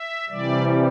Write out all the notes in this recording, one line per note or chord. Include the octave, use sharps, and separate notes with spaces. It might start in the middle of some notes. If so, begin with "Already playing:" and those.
Already playing: E5
C3 E3 G3 D5